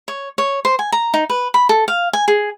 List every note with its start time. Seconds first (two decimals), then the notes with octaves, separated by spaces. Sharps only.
0.08 C#5
0.38 C#5
0.65 C5
0.79 G#5
0.92 A#5
1.14 D#4
1.30 B4
1.54 B5
1.69 A4
1.88 F5
2.13 G#5
2.28 G#4